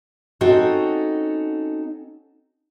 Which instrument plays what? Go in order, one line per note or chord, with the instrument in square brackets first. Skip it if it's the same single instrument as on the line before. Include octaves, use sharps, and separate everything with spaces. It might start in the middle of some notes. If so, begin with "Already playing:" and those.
[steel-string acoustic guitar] C4 C#4 D#4 F#4 A4